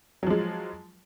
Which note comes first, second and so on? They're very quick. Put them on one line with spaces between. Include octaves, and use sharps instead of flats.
F#3 F3 G#3